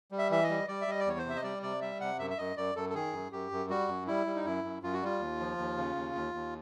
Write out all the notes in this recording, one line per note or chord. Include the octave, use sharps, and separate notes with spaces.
G3
E5
E3 E5
D#5
G3
G3 D5
E5
G3 D#5
D5
E2 C#5
C5
C3 E5
D#5
G3 D5
C3 D5
G3 E5
C3 F#5
F#2 E5
E5
F#2 D#5
F#2 D5
F#2 A4
A4
D#3 G#4
F#2
F#2 G4
F#2
G3 F#4
F#2
G3 E4
G3
D#4
F#2 E4
F#2
F#2 F4
F#4
G3 F4
D#2
F3
D#2
C#3
D#2
D#2
D#2